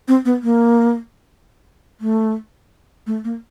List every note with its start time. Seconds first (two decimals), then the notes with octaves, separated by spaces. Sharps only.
0.08 C4
0.25 B3
0.43 A#3
2.01 A3
3.07 A3
3.24 A#3